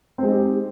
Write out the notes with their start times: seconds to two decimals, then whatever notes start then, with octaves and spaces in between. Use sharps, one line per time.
0.18 C4
0.23 G#3
0.27 D#4
0.32 G4